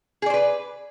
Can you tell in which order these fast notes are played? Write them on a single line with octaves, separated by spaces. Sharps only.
G#4 D5 C5 B4